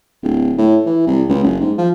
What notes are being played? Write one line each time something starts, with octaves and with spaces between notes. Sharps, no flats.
D1
A2
E3
C2
C#2
F#1
G#2
F3